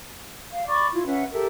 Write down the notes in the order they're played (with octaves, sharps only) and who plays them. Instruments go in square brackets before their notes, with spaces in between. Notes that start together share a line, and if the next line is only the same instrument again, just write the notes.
[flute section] F5
D5 B5 C#6 D6
E4 F4
C#4 B4 E5 F#5
G4 A4 A#4 E5